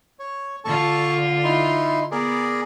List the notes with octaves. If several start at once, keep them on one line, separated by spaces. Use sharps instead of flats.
C#5
D3 F4 A4 A5 C#6
D#4 E4 C6
B3 G#4 A#4 D5